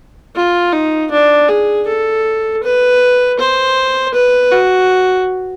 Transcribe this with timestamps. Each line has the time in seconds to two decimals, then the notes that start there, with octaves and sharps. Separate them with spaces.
0.36 F4
0.73 D#4
1.11 D4
1.49 G#4
1.87 A4
2.63 B4
3.39 C5
4.14 B4
4.52 F#4